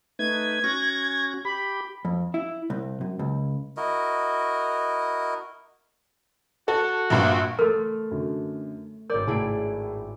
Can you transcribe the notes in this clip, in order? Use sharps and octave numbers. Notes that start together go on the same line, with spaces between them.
A3 D#4 B4 G#6
C#4 F#4 A#6
G4 B5
F2
E4
C2
F#2
C#2
E4 F#4 A#4 D#5
F#4 A4
A#1 G2 A#3
A3 A4 A#4 C6 F6
F#2 D3
G#1 A#4 D5 G6
A2 E4 G#4 A5 D7